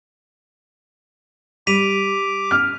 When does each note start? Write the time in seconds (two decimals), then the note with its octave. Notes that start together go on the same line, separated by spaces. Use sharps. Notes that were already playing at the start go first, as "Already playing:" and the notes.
1.67 G3 D6 B6 D#7 F7
2.51 F6